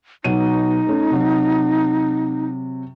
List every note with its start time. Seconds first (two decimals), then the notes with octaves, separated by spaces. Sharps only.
0.24 B2 F#3 D#4 D#7
0.87 A3 C#4
1.11 C3 F#3